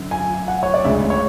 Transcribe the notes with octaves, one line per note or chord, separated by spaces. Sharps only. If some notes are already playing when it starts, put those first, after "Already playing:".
Already playing: F#2 D3
G#5
F#5
C#5
D5
D2 C#3 G#3 E5
C#5